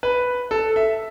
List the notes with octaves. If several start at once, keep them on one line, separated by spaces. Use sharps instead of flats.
B4
A4
E5